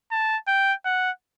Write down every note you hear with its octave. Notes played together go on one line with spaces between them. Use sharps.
A5
G5
F#5